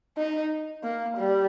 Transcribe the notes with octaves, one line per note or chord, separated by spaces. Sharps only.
D#4
A#3
G3